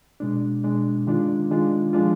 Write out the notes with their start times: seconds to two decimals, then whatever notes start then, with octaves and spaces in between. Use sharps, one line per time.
0.20 B2 G#3 D4
0.64 B2 G#3 D4
1.07 D#3 G#3 D4 F4
1.50 D#3 G#3 D4 F4
1.93 F3 G#3 D4 F4